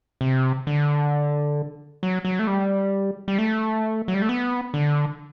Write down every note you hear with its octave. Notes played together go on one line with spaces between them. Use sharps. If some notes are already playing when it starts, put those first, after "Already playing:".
C3
D3
F#3
F#3
A3
G3
G3
A3
F#3
G3
A3
B3
D3